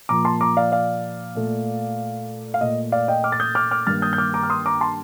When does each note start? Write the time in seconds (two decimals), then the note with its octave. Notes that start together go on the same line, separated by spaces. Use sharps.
0.09 A#2 F3 A#3 A#5 D6
0.25 A5 C6
0.41 A#5 D6
0.57 D5 F5
0.72 D5 F5
1.35 A#2 A3
2.54 F5
2.61 A#2 A3 D#5
2.92 D5 F5
3.08 D#5 G5
3.24 D6 F6
3.32 A6
3.40 D#6 G6
3.55 D6 F6
3.71 D6 F6
3.87 G2 D#3 G3 A#3 F6 A6
4.02 D#6 G6
4.13 G6
4.18 D6 F6
4.34 A#5 D6
4.43 F6
4.50 C6 D#6
4.66 A#5 D6
4.81 A5 C6